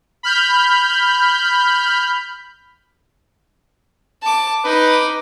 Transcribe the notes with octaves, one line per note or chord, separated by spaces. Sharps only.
B5 F6 G6
A5 D6
D#4 B4 D6